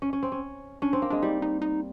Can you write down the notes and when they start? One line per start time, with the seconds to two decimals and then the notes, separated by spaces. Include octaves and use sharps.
0.02 C#4
0.13 C#4
0.23 C4
0.32 C#4
0.82 C#4 D4
0.93 C4
1.02 A#3
1.10 G#3 D4
1.22 G3 D#4
1.42 D#4
1.62 D#4